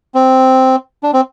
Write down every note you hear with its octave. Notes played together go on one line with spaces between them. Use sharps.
C4
D4
C4